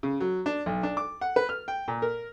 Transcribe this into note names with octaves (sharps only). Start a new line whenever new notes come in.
C#3
F#3
D4
B1
D4
D6
F#5
B4
F6
G5
A#2
A#4